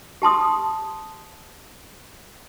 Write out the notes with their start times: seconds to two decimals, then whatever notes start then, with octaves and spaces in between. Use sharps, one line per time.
0.22 G4 A5 C6 D#6